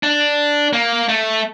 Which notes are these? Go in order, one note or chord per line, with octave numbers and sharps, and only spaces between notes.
D4
A#3
A3